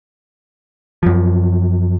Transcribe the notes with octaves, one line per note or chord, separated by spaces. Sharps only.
F#2 F3